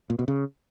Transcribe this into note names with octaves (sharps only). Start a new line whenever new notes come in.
A#2
B2
C#3